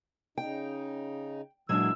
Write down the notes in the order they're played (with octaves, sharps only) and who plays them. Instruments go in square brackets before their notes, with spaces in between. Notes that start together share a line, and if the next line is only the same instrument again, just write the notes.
[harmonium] C#3 D#4 [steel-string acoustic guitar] G5
[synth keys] A#2 F#3 G#6 [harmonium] E3 [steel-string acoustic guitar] G#3 D4 [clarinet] E6